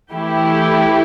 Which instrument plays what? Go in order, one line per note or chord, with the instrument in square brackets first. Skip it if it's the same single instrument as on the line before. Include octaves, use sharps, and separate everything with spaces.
[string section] E3 A3 E4 G4